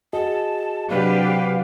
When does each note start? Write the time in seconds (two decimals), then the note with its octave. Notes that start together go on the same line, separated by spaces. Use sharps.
0.13 F#4 G#4 D#5 A5
0.89 C3 F#3 D4 G4 B4 F5